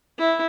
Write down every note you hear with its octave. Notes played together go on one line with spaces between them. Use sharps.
E4